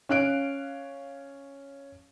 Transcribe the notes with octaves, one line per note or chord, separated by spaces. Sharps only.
C#4 F5 F#6 D7